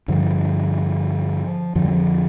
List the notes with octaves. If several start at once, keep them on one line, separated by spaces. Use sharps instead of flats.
G2 D3 F3
F2 D3 F3
G3
F3